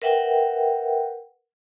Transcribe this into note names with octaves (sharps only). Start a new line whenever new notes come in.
A#4 B4 E5 F#5 G5